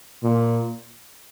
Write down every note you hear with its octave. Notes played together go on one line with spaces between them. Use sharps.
A#2